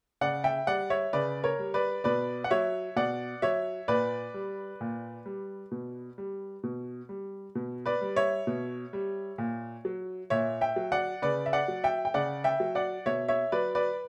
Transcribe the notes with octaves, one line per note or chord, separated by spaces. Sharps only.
C#3 D5 F#5
E5 G5
G3 D5 F#5
C#5 E5
C#3 B4 D5
A#4 C#5
G3
B4 D5
B2 B4 D5
F#5
F#3 C#5 E5
B2 D5 F#5
F#3 C#5 E5
A#2 B4 D5
G3
A#2
G3
B2
G3
B2
G3
B2
B4 D5
G3
C#5 E5
B2
G3
A#2
F#3
A#2 C#5 E5
E5 G5
F#3
D5 F#5
C#3 B4 D5
E5
D5 F#5
F#3
E5 G5
G5
C#3 D5 F#5
E5 G5
F#3
D5 F#5
B2 C#5 E5
C#5 E5
F#3 B4 D5
B4 D5